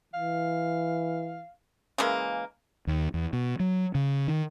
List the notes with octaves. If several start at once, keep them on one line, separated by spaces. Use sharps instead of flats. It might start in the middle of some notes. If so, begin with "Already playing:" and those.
E3 F5
C#3 E3 G#3 A#3
D#2
E2
B2
F#3
C#3
D#3